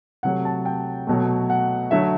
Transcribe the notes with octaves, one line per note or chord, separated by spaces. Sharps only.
C3 F#3 A3 F#5
A5
G5
B2 F#3 A3
F#5
D3 F#3 A3 E5